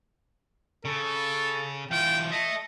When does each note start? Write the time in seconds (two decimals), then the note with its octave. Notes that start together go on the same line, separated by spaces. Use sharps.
0.85 C#3 A4
1.91 E3 F4 G5
2.32 D#5 E5 A5